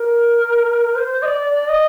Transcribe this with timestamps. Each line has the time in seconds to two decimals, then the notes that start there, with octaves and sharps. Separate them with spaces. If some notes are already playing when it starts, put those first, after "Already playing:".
Already playing: A#4
0.96 C5
1.22 D#5
1.26 D5
1.49 D5
1.68 D#5